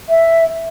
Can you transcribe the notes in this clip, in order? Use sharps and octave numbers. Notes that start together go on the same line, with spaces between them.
E5